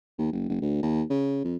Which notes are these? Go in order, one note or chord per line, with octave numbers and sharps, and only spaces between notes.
D#2
F#1
F#1
D2
D#2
C#3
F2